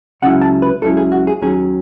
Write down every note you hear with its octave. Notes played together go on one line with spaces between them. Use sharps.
C#2 C#3 F#3 C#4 E4 F#5
A5
B4
C#2 C#3 F#3 C#4 E4 A4
G#4
F#4
G#4
D#2 D#3 F#3 C#4 G#4